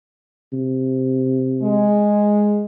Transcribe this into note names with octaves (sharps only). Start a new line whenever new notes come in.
C3
G#3